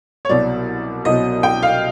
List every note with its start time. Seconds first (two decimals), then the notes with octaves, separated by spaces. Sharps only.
0.25 C#5
0.29 C2 B2 F#3 D5
1.05 C2 B2 F#3 D#5
1.43 G5
1.63 F5